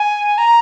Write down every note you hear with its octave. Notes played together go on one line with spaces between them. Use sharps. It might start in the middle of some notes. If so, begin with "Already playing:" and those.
Already playing: G#5
A#5